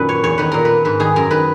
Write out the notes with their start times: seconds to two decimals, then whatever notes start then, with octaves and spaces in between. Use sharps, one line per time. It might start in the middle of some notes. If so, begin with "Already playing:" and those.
Already playing: F#2 A#2 D#3 B4
0.09 C#5
0.24 E2 C#5
0.38 D#3 B4
0.52 A#2 A#4
0.65 B4
0.85 G#2 B4
1.00 D#3 G#4
1.16 F#2 A#4
1.31 D#3 B4